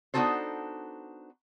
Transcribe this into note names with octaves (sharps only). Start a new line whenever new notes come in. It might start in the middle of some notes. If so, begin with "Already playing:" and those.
B3 D4 D#4 F#4 A4 C5